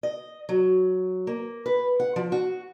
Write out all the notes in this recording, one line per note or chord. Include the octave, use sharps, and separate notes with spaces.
D#5
F#3
A#3
B4
F#5
F3
F#4